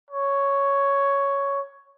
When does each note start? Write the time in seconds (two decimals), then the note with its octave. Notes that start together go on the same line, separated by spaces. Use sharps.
0.11 C#5